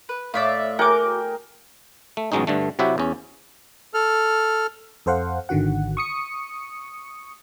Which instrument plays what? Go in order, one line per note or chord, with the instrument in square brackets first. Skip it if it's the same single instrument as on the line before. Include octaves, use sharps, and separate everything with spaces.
[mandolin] B4
[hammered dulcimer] A2 [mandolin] D5 E5 F5
[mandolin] F#4 D6 [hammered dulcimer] G#4 A#4 G5
[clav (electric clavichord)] A3
A1 B2 F#3 G#3 C#4 D#4
G2 D3 A3
C3 F#3 E4 F#4 G4 E5
E2 C#4
[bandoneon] A4 F6
[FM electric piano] F2 A4 C5 F5 F#5
G#1 D3 D#3 F#4 F#5
C#6 D#6 C#7